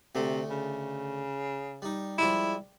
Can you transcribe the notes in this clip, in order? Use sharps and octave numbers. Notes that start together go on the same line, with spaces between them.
D2 C3 A3
C#3
G3 D#4
F3 G3 G#3 E4